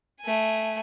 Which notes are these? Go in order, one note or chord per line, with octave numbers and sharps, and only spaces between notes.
A3 G#5